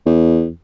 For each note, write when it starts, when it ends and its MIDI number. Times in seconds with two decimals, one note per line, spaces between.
0.06 0.49 40